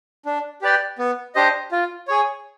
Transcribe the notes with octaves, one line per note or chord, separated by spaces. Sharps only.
D4
G4 B4 D5 G5
B3
D4 G4 C5 D#5
F4
G#4 C#5